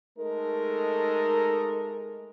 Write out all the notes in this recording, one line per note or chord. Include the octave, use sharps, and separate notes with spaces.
G#3 A3 D#4 A4 A#4